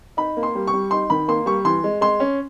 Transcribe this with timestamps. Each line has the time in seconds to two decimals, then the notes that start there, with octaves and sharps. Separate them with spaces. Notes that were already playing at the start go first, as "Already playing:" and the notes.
0.17 D#4 B5
0.37 A#3
0.43 C6
0.55 G3
0.67 C#6
0.74 G3
0.91 D#4 C6
1.10 D#3 B5
1.28 A#3 C6
1.46 G3 C#6
1.65 E3 C6
1.84 G#3
2.01 G#3 C6
2.20 C#4